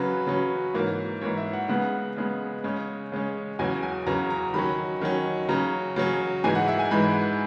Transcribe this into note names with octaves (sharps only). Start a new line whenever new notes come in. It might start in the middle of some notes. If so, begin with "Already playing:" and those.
Already playing: C#3 F#3 C#4 B4
C#3 F#3 C#4
G#2 E3 A#3
G#2 E3 A#3 C#5
E5
F#5
C#3 G#3 B3 F#5
C#3 G#3 B3
C#3 G#3 C#4
C#3 G#3 C#4
E2 C#3 F#3 C#4 G#5
G#5
E2 C#3 F#3 C#4 A#5
A#5
D#3 F#3 C#4 B5
D#3 F#3 C#4
C#3 F#3 C#4 A#5
C#3 F#3 C#4
G#2 E3 G#3 G#5
F#5
E5
G#5
G#2 E3 G#3 B5